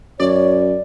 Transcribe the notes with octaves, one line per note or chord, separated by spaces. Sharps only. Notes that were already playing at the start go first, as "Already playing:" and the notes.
F#2 C#5 D5